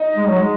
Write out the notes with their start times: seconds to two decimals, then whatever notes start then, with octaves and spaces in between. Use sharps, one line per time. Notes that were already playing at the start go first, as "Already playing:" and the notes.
Already playing: D#4
0.17 G#3
0.28 F#3
0.39 G#3